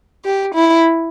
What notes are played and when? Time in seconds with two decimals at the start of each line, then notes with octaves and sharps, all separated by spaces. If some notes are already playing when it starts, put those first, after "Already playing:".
0.24 G4
0.54 E4